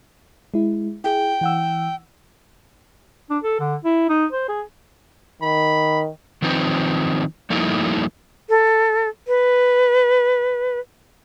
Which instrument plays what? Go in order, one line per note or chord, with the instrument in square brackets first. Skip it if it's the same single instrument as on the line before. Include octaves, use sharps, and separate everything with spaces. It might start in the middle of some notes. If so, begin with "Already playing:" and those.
[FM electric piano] G#3 E4
[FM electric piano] E4 G#4 [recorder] G5
[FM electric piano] E3 F#5 E6
[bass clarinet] D4
A4
D3
E4
D#4
C5
G#4
[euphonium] D#3 [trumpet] B5
[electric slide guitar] D#3 F3 C4 D#4 B4
F3 G3 A3 A#3 D#4 E4
[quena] A4
B4